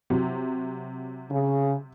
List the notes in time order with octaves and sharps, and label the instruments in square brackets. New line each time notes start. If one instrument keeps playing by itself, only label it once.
[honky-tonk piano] C3 F#3
[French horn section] C#3